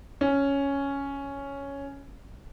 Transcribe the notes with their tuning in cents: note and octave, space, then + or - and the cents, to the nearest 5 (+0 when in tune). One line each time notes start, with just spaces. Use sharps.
C#4 +5